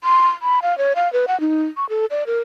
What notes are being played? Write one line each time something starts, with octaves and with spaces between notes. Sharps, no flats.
C6
B5
F5
C#5
F5
B4
F#5
D#4
C#6
A4
D5
A#4